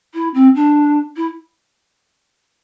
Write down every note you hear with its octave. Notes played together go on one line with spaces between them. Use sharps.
E4
C4
D4
E4